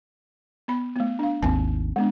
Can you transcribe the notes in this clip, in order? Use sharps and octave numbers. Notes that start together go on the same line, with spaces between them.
B3 B5
A3 B3
D4 F5
G#1 D#2 C4 G#5
G#3 B3 D4